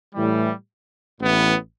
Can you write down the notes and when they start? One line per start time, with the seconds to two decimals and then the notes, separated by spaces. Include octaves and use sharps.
0.14 A2 E3 G3
1.19 A1 A2 E3 B3